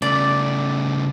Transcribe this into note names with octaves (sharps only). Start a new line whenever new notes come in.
C#3 A3 D5